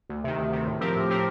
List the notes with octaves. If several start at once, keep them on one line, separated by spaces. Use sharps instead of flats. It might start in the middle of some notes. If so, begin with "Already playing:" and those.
D2
C3 D#3
D2
C3 D#3
A2
F3 C4 G4 A#4
A2
F3 C4 G4 A#4